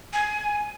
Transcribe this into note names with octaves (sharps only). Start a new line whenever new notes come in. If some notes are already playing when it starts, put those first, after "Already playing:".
G#5